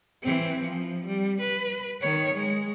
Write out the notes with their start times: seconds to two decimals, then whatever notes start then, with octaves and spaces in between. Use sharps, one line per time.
0.22 E3 C4
0.61 F3
1.06 G3
1.41 B4
2.01 D#3 C#5
2.34 G#3